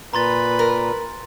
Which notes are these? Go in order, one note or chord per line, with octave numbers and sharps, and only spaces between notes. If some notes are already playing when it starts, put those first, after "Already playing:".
A#2 B4 A#5 C6 A6
A#4